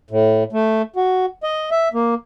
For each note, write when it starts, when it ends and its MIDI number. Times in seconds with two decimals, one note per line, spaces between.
0.11 0.43 45
0.53 0.82 57
0.96 1.26 66
1.43 1.69 75
1.71 1.88 76
1.94 2.15 58